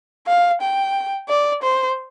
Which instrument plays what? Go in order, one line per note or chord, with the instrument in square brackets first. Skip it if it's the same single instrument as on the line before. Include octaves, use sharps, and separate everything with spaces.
[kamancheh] F5
G5
D5
C5